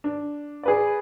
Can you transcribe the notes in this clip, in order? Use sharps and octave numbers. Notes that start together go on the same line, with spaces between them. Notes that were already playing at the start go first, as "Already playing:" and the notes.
D4
G#4 B4 D5